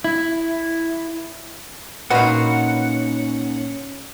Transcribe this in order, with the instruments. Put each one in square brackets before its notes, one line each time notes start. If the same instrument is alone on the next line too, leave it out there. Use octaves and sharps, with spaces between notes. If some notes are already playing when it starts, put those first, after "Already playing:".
[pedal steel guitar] E4
[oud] A#2 D#4 B4 [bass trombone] C#4 [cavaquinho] F#4 F5 [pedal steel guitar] F#5